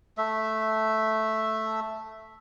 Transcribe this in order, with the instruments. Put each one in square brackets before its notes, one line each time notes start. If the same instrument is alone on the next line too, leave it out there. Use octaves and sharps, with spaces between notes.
[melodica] A3 E5